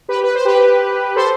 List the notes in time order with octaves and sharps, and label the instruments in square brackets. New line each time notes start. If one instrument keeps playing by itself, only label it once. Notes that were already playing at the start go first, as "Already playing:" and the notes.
[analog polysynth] G4 B4
B4
C5
G4 B4
A4 C5